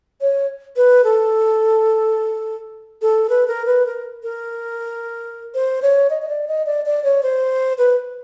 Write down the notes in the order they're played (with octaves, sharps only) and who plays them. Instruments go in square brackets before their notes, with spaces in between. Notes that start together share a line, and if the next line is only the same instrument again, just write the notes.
[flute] C#5
B4
A4
A4
B4
A#4
B4
A#4
A#4
C5
C#5
D#5
D#5
D5
D#5
D5
D5
C#5
C5
B4